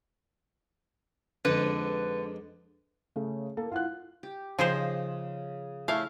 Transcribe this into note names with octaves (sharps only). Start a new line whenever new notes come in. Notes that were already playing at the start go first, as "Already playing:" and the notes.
F2 G#2 D3 B4
C#3 A3
A#3 A4
E4 F4 F#5 F#6
G4
C#3 F3 D#4 G#4 C5
A3 C#4 E4 F5